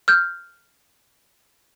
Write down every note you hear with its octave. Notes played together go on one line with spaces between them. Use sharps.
F6 G6